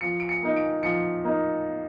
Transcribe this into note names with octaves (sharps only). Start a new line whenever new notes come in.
F3 C#7
D7
C#7
A#3 D#4
D7
F3 C#7
A#3 D#4